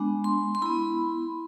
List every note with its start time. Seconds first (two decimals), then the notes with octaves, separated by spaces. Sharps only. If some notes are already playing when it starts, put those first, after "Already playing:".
Already playing: G#3 B3 D4
0.24 C6
0.55 C6
0.62 B3 E4 B5